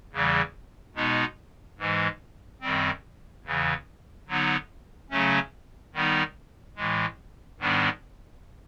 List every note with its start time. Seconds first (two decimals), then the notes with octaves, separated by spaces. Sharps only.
0.12 E2 C#3 E3 G3
0.95 B2 G#3 B3 D#4
1.79 G#2 E3 G#3
2.61 F#2 D#3 G3 C4
3.44 E2 C#3 E3
4.28 D3 F#3 B3 D#4
5.10 C#3 F#3 A3 C#4
5.94 D#3 G3 B3 D#4
6.76 A2 E3 G#3
7.60 G#2 D#3 G3 B3 D4